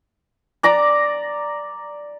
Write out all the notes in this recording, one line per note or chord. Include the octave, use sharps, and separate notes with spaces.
D5 A#5 D6